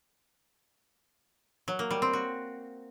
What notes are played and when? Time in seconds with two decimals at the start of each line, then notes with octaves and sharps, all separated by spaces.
1.68 F#3
1.79 A#3
1.91 G3
2.02 C4
2.13 F#4